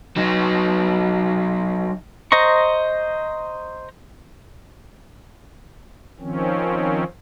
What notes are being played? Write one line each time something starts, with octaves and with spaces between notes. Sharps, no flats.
F#3 D#4
C5 D#5 A#5 C#6
D#3 F3 C4 C#4